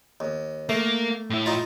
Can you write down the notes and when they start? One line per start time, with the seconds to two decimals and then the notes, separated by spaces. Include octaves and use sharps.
0.20 D#2
0.69 A3 A#3
1.30 A2 E4
1.46 D#4 F4